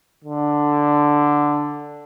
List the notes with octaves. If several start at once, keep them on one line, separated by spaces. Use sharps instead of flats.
D3